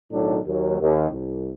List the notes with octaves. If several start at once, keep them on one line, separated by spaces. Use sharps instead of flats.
B1 A2 D#3 F#3 D4
D#2 F#3
D#2
C2